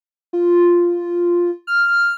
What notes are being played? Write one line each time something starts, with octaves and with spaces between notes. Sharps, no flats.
F4
F6